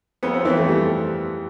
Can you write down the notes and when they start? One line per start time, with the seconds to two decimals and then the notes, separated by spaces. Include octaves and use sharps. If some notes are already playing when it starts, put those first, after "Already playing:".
0.23 F2 B3
0.34 C4
0.45 E3 C4
0.56 A3
0.68 G3